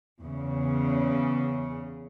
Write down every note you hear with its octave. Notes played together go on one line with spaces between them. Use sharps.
E2 C#3